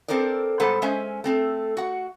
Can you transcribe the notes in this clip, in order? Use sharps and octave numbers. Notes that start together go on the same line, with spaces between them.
C4 A4 A#4 C5 D5
G#2 G3 B3 A4 C5 F#5
G#3 C#4 C5 E5 G#5
A3 C4 A4
F#4 F#5